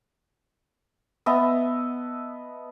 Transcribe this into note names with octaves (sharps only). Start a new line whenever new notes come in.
B3 D#5 E5 A5